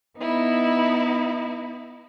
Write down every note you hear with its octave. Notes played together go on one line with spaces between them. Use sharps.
B3 D#4 E4